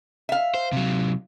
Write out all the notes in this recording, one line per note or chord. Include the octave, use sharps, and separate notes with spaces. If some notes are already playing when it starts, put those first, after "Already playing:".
E5 F5
C5
C3 F#3